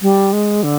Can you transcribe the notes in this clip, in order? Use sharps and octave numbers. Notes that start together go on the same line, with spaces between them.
G3
G#3
D3